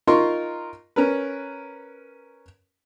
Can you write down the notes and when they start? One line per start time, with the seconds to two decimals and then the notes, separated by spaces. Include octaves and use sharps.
0.07 D#4 F4 A#4 C6 C#6
0.96 C#4 A#4 B4